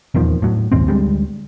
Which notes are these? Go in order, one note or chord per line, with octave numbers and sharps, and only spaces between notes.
D#1 E2 D#3 F3
A2 F#3
A#1 D#2 G#2 C4
D2 G3 G#3